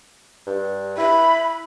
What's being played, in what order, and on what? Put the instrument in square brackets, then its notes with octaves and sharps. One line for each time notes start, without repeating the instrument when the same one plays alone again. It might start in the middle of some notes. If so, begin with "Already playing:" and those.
[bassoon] G2
[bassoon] E4 [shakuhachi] B5